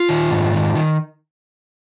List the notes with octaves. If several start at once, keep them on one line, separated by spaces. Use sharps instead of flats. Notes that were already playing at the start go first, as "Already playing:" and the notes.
Already playing: F4
D#3
G#2
D#3
D#3